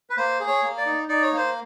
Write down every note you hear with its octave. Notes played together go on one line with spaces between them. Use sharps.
B4
A#3 C5
G#4
C#5
A#3
D5
D#4
D#4 D5
C#5
A#3 C5